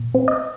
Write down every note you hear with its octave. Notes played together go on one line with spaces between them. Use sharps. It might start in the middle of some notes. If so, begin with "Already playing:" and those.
Already playing: A#2
C4
D#5